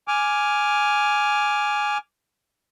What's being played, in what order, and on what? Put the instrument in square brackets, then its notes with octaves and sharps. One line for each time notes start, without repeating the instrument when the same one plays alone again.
[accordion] G#5 D6 F6